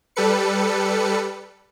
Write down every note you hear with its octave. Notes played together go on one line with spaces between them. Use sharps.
G3 A4 B4 C#7